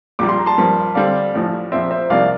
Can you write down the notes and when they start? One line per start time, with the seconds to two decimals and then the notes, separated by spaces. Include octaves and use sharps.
0.19 A#1 A#2 G3 D6
0.29 C6
0.38 A#5
0.46 A5 C6
0.58 G2 F3 A#3
0.95 D3 G3 C4 D5 F5
1.34 A1 A2 F3
1.72 A#1 A#2 F3 C4 C5 E5
1.91 C5 E5
2.10 C2 C3 F3 A#3 D5 F5